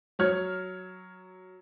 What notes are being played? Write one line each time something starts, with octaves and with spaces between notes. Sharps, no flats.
F#3 C#5 F6 G#6